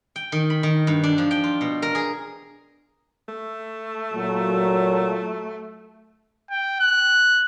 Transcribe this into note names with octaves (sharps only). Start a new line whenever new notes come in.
G5
D#3
B5
D#3
G2
D4
F3
G5
F4
B2
A#4
G#4
A3
A#2 F#3
G5
F#6